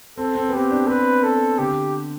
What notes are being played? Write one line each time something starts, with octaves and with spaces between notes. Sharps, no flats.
C4 A4
C4
B3
C4 G4
D4
C4 B4
A4
D3 G4